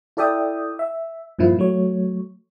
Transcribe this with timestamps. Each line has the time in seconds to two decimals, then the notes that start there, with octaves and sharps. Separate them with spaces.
0.17 E4 A4 D5 E5 G5 D#6
0.79 E5
1.39 G2 A#2 F3 E4
1.59 F#3 A3 C#5